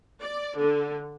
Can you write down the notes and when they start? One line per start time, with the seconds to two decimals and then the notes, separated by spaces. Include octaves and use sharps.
0.21 D5
0.57 D3